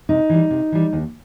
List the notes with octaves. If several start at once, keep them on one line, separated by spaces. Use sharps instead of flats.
C3 D#4
E3 G3
C3
E3 G3
D#2